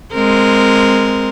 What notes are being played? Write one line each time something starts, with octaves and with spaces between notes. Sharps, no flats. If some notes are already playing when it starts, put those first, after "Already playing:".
G#3 C4 A#4